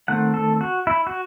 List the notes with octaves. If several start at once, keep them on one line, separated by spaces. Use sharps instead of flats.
D#3 A3 C4 F#5
A4
F#4
E4
F#4